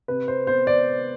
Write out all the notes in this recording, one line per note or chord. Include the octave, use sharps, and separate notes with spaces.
C3 B4
C5
B3 C5
D5